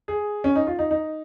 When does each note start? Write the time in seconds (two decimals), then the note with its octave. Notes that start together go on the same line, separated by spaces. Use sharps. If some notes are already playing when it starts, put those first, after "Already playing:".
0.08 G#4
0.44 C#4
0.56 D#4
0.67 F4
0.79 D#4
0.91 D#4